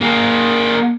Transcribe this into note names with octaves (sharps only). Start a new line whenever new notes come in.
A#3 G#4